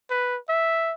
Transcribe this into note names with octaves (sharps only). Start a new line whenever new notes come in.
B4
E5